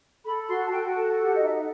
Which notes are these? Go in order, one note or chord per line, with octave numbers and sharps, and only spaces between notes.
A4 B5
F#4 C6
A5
F#4 G5
A4 A5
G4 F#5
D#5
D#4 E5
F#5